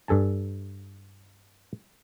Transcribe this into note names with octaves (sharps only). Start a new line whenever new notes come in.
G2 A4 G#5 A5